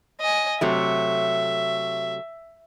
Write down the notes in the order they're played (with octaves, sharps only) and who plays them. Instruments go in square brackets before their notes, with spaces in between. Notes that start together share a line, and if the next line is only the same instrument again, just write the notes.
[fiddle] D#5 G#5
[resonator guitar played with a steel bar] C3 F#3 A3 [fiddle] E5